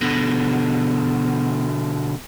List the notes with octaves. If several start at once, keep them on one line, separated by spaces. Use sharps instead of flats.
B2 D3